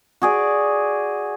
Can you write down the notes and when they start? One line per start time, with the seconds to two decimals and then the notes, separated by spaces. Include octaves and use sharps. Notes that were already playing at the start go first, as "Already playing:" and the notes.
0.22 F#4 G#4 D5